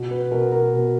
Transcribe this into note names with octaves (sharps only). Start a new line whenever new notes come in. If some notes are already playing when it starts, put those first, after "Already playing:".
Already playing: B2
B4
B2 A#4
A#4
B2